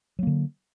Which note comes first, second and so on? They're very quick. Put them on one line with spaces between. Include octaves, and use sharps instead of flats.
F#3 A#3 D3